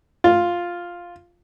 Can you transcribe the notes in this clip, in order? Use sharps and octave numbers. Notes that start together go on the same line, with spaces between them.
F4